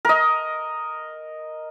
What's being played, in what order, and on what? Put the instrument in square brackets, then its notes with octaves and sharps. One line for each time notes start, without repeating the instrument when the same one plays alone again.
[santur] A#4 D#5